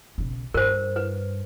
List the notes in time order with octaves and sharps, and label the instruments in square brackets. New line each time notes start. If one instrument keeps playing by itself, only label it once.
[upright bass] B1 C#3
[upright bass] G2 [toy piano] A#4 C5
[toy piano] B4